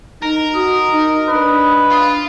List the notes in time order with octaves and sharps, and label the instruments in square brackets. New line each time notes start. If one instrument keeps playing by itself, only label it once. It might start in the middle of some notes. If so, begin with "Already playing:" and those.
[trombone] D#4 [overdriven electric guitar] A#4
[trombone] F#4 [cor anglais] D#5
[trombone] D#4
[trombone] D4 [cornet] B4
[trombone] D4 [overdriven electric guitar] F4